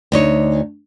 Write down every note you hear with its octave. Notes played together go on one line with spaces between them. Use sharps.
D2 D#4 C#5